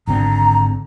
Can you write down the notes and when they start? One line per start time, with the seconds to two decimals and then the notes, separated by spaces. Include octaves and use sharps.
0.07 G#1 D3 C4 A#5